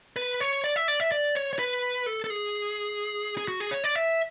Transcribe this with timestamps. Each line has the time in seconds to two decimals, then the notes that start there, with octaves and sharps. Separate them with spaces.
0.16 B4
0.40 C#5
0.64 D5
0.76 E5
0.88 D5
1.00 E5
1.12 D5
1.35 C#5
1.53 C#5
1.59 B4
2.06 A4
2.24 A4
2.30 G#4
3.38 G#4
3.48 F#4
3.60 G#4
3.71 C#5
3.84 D5
3.95 E5